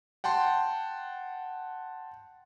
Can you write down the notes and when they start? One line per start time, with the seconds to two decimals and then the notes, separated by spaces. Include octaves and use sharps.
0.24 F#5 G5 A5 C6